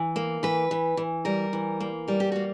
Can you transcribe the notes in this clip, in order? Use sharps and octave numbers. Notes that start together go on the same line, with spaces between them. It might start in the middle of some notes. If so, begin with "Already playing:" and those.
Already playing: E3
A#3
E3 B4
E3
E3
G3 A#4
E3
A#3
G3 A#4
G4
A#3 F#4